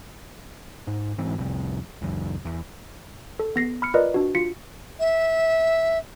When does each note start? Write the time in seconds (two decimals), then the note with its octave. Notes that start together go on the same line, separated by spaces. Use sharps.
0.87 G#2
1.18 G#2 E3 C4
1.38 C2 F2 C3
2.02 C#2 F#2
2.45 E2
3.39 A4
3.56 B3 A#6 C7
3.82 B5 F6 C#7
3.94 F4 A#4 B4 D5 D#5
4.14 D4 F#4
4.35 F4 B6 C#7
5.00 E5